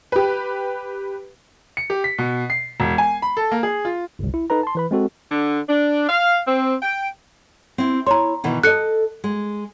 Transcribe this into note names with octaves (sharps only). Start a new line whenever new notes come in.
G4 B4
C#7
G4
B6
B2
C7
E1
G#5
B5
A4
A#3
G#4
F4
G1 C2
E4
D#4 A4 B4 A#5
A5 C6
E3 B4 B5
G#3 C4 F#4 A4
D3
D4
F5
C4
G5
C4 E4
E4 C#5 A#5 C6
B2 D#3 E3
A4 D#5 F#6 C#7
G#3